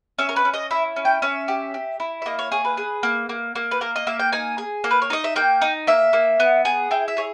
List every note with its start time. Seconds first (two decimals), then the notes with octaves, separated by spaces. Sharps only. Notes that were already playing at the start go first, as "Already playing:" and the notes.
0.19 C#4 E5
0.29 A#4
0.36 B4
0.45 C#4
0.54 D#5
0.71 E4 E5
0.96 C#4
1.05 G5
1.22 C#4 E5
1.48 G4
1.74 G4
2.00 E4
2.22 E5
2.26 A#3 D#5
2.39 C#5
2.52 G#4 C#5
2.65 B4
2.77 G#4
3.03 A#3
3.29 A#3
3.55 A#3
3.71 B4
3.81 A#3 A#4
3.96 D#5
4.07 A#3 E5
4.19 G5
4.33 D#4 G#5
4.58 G#4
4.84 A#3
4.91 B4
5.02 C#5
5.10 D#4 D#5
5.24 E5
5.36 A#3 G5
5.62 D#4
5.87 A#3 E5
6.13 A#3
6.40 B3
6.65 G#4
6.91 E4 G5
7.08 E5
7.17 G#4 C#5